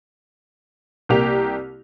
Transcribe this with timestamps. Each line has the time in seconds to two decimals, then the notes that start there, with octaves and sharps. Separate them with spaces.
1.09 C2 A#3 G4 F7